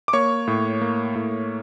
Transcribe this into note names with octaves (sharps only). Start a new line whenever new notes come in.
D6
A#3 C#5 C#6
A2
A#3
A2